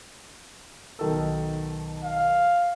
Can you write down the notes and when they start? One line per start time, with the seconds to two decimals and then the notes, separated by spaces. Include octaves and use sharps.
0.99 B1 D#3 A4
2.03 F5